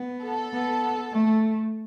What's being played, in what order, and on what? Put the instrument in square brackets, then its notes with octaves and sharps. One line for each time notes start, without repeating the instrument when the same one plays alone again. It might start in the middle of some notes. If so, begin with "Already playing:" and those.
Already playing: [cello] B3
[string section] A4
[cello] B3
A3